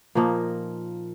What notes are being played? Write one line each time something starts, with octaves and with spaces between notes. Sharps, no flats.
A#2 F3 A#3 D#4